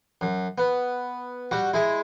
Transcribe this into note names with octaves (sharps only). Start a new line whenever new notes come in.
F#2
B3
G3 F#4
G#3 E4